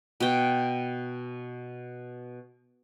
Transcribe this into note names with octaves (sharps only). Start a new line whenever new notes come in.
B2 G5